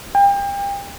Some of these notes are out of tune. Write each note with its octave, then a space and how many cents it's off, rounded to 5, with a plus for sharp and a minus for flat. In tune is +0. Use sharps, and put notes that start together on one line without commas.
G5 +35